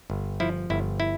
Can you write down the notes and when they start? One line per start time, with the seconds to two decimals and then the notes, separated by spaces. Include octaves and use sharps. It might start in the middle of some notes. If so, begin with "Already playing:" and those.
0.10 G1
0.40 F3 E4
0.70 G1 E4
1.00 E4